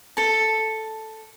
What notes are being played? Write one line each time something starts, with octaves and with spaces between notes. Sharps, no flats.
A4 A5